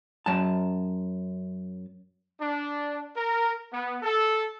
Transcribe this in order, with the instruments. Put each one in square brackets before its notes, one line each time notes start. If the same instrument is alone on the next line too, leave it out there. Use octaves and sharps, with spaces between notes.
[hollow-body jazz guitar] F#2 A5
[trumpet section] D4
A#4
B3
A4